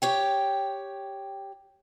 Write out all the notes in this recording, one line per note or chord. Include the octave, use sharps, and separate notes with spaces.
G4 C#5 G5